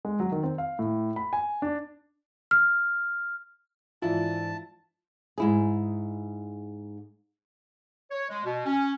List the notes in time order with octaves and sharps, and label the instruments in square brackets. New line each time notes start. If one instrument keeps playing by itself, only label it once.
[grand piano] G#3
F#3
D#3
C4
F5
A2
B5
G#5
D4
[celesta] F6
[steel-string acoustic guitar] G#2 E3 D4 [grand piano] E4 [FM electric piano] F4 [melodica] A5
[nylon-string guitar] G#2 E4 G#4
[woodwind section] C#5
G#3
B2
C#4